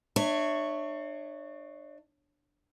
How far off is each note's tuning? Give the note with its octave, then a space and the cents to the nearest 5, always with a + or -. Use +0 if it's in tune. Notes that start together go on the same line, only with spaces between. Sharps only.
D4 +35 C#5 +0 E5 -5